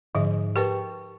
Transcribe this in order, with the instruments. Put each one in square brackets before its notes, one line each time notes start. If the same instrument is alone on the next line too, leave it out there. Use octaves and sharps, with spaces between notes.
[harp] G#2 [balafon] D3 F3 E5
[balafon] G4 A#4 B4 [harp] G5 A5 C#6